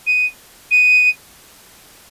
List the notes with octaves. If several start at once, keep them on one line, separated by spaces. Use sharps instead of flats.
D#7
D#7